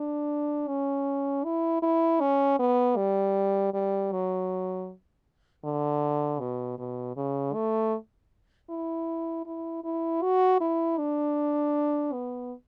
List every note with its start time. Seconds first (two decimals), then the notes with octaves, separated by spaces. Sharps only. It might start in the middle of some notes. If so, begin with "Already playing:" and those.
Already playing: D4
0.68 C#4
1.44 E4
1.82 E4
2.20 C#4
2.59 B3
2.96 G3
3.73 G3
4.12 F#3
5.64 D3
6.40 B2
6.78 B2
7.16 C#3
7.54 A3
8.69 E4
9.46 E4
9.84 E4
10.22 F#4
10.61 E4
10.98 D4
12.13 B3